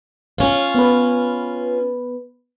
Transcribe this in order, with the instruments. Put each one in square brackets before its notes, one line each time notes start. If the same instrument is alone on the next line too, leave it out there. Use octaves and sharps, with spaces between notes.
[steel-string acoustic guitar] C#4 F4
[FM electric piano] B3 B4